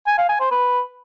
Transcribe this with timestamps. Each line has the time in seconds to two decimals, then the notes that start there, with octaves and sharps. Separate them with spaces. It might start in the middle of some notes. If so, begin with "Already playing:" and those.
0.07 G#5
0.18 F5
0.29 G#5
0.40 C5
0.51 B4